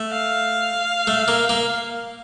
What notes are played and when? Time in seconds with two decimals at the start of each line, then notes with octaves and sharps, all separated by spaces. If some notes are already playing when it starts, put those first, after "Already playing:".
Already playing: A3
0.11 F5
1.07 A3
1.28 A#3
1.49 A#3